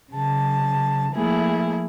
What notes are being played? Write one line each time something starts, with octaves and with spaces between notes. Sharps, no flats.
C#3 F#3 A5
F3 A3 A#3 E4 G#4